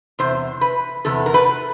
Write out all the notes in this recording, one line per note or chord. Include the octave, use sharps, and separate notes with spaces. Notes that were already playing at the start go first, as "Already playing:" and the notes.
E2 C3 C5
B4
E2 C3 B3 A4
A#4
B4